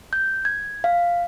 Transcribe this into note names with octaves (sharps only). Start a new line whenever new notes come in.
G6
G#6
F5